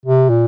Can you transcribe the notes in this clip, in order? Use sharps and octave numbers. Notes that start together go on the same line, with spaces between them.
C3
A#2